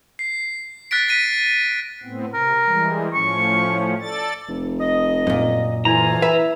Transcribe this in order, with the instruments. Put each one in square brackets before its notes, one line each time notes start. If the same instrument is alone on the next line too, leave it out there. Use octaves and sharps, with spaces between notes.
[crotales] C7
F#6 A6 B6 D7
A#6 B6 D#7
[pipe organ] A2 B3 C4
[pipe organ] C3 [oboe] A#4
[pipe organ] E3 G3 G#3
[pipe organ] A2 F3 C#4 [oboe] C#6
[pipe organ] A4 D5 A6
[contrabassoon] F1
[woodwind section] D#5
[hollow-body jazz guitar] F#2 A#2
[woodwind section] D2 F4 G#5 [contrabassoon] E3 [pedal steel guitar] A#5
[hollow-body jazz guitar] B4 E5